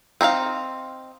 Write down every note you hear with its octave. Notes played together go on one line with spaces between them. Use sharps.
C4 D#4 E4 F5